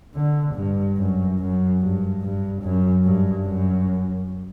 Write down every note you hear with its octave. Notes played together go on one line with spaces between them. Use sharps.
D3
G2
F#2
F#2
G2
G2
F#2
G2
F#2